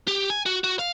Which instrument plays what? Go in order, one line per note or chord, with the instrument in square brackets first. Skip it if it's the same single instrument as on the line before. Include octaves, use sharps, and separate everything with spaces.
[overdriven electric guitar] G4
G#5
F#4
F#4
F5